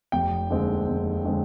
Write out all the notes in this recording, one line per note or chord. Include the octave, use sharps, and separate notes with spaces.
F1 G5
D#2 D3 G#3 C4
F1
D3 G#3 C4